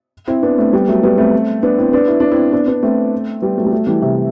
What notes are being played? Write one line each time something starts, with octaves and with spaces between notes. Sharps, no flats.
C4 E4
B3 D4
A3 C4
G3 B3
F#3 A3
G3 B3
A3 C4
B3 D4
C4 E4
B3 D4
E4
D4
C4 E4
B3 D4
B3 D4
A3 C4
G3 B3
F#3 A3
G3
F#3 A3
E3 G3
C3 E3